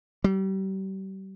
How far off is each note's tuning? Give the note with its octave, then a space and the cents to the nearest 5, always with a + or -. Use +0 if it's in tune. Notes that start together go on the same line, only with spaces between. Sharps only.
G3 -35